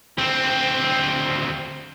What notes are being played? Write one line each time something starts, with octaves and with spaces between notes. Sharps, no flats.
D2 C4